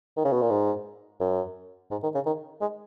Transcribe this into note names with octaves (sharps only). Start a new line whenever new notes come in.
D#3
C#3
B2
A#2
G#2
F#2
G#2
D#3
C#3
D#3
G#3